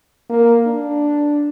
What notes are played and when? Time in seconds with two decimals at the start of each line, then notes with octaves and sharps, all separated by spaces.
0.30 A#3
0.67 D4